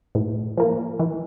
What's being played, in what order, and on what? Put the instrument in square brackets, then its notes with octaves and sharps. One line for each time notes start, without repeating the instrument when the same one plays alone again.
[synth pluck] A2
F3 A#3
E3